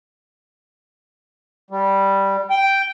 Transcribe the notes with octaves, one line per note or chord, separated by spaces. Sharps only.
G3
G5